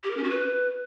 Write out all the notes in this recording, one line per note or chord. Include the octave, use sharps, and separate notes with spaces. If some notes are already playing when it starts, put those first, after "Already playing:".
G4
A#4
C#4
F#4
B4